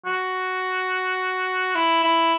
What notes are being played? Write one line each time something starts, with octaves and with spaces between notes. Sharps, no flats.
F#4
E4
E4